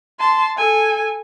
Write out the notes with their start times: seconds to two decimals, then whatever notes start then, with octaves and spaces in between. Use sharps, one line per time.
0.19 A5 C6
0.57 A4 G#5